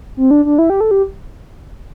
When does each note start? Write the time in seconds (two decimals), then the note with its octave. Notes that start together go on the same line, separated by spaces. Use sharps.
0.17 C4
0.31 D4
0.45 D4
0.58 E4
0.70 G4
0.81 A4
0.91 G4